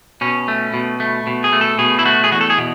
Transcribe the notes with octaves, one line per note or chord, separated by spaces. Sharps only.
B2 C#4
A3
B2
A3
B2
G#4
A3
A4
B2 G#4
E4
A3 F#4
G#4
E2 F#4
A4
G#4
B2